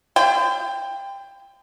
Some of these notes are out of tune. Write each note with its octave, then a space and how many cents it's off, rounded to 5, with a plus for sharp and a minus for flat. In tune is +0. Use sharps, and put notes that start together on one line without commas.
G5 +15 C6 -40